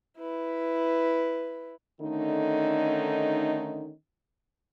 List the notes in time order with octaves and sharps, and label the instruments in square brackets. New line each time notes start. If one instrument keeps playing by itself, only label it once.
[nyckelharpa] E4 B4
[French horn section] D3 D#3 A3 C#4 D#4